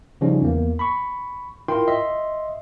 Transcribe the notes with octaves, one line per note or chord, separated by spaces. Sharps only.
C#3 F3 G3 C#4 D#4
E2 A#3
B5 C#6
E4 F4 A#4 G5 C6
D#5 E5 C6